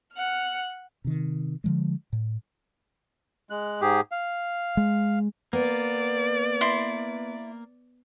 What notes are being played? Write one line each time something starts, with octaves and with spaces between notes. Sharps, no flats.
F#5 F6
C3 D#3
D3 F3 G#3
A2
G#3 F#6
G#2 G4 G#4
F5
G#3
A#3 B3 D5
E4 C6